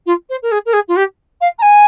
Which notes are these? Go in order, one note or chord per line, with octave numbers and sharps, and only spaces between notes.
F4
C5
A#4
G#4
A#4
G#4
F4
G4
F5
A#5
G#5